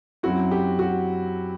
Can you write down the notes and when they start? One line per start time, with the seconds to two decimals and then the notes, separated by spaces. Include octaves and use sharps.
0.23 F#2 F#3 C4 E4 F#4
0.51 G4
0.79 F#4